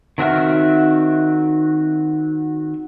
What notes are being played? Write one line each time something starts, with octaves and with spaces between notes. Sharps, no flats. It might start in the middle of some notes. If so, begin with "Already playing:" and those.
D#3 C4 F#4 E5 F6